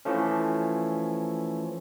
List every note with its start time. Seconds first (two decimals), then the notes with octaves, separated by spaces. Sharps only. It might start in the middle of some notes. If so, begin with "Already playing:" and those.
0.05 E3 F3 A3 C#4